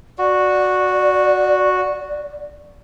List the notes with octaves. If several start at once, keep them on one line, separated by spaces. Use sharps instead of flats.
F#4 D5